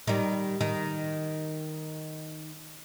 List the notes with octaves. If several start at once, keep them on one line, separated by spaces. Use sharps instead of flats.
D#3 G3
D#3